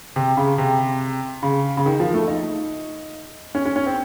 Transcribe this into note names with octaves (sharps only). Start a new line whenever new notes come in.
C3
C#3
C3
C#3
C#3
D#3
F3
A3
D#4
C#4
C#4
C#4
C4